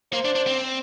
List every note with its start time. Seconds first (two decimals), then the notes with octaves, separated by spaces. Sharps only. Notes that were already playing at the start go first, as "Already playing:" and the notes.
0.13 A#3 C5
0.25 D4
0.35 D4
0.47 C4